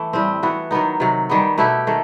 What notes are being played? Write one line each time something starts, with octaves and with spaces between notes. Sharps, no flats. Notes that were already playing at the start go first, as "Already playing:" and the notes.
Already playing: E3 A3
A2 G3 C4
E3 B3 F#4
D#3 F#3 B3 D#4
C3 D#3 F#3
D#3 G3 B3
B2 A3 E4 G4
D#3 A3